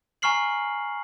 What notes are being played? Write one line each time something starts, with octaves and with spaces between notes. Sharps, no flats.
G#5 A#5 C#6 F6 C7 F#7